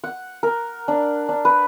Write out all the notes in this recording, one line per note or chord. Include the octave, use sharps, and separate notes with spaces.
F#5
A#4
D4
D4
B4